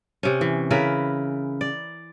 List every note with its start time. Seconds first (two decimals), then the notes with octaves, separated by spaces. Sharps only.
0.23 C3 C#4
0.41 E3
0.71 C#3 E4 A#4 B4
1.61 D5